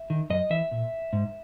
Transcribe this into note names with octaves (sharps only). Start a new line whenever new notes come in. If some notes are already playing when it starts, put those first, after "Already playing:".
Already playing: E5
D#3
F#2 D#5
E3 E5
A#2
G#2